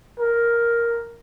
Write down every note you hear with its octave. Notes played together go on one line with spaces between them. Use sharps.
A#4